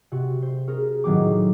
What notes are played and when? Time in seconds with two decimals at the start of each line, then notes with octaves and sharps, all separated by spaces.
0.12 C3 F#4
0.42 C5
0.67 C#4 G#4 A#4
1.04 A2 D#3 F#3 C4 D6